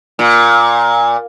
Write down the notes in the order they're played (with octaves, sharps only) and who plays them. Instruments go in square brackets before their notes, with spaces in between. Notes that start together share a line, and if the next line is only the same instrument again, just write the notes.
[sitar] A#2